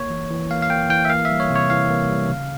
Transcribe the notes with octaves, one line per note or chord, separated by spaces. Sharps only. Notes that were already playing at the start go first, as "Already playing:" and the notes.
Already playing: A#3 C#5
E3
E3
A#3 F5
F5
A#3 G5
E3 G5
E5
A#3 F5
E5
G3
C#5
C3
C#5
E3 F5
A#3
G3
C#3